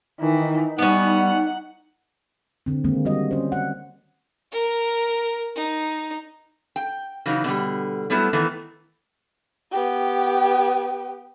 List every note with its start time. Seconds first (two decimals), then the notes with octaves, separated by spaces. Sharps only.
0.21 D#3 E3 D#4
0.79 G3 B3 C#4 F#5
2.66 D3 C4
2.84 D3 D#3 G#3 A#3 C4
3.05 G3 F#4 D#5
3.31 C#4 C5
3.52 F#5
4.52 A#4
5.56 D#4
6.76 G5
7.26 C#3 E3 F#3 D#4
7.44 B2 D3 G3
8.10 F#3 G3 A3 B3 E4
8.33 D#3 E3 A3 B3
9.72 B3 G4